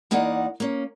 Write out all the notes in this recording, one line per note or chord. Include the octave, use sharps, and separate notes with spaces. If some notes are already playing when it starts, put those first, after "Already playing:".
E2 A#3 D#4 D5 F#5
A#3 C#4